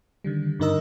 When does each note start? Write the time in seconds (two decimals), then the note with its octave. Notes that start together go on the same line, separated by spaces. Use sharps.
0.24 D3 D#3 G3
0.60 G2 D3 D#4 A#4 D#5 E6